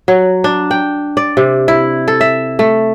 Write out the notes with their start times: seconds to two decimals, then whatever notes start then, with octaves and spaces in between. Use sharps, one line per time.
0.08 F#3
0.44 D4
0.71 G5
1.17 D5
1.37 C3
1.68 E4
2.08 A4
2.21 E5
2.59 A3